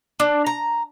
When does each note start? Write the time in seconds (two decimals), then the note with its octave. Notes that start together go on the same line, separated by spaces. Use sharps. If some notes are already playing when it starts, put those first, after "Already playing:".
0.20 D4
0.47 A#5